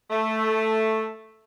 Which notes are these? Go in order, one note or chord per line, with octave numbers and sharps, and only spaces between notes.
A3